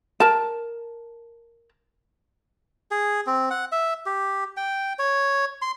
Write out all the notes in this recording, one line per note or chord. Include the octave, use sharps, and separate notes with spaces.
A#4 A5
G#4
C4
F#5
E5
G4
G5
C#5
C6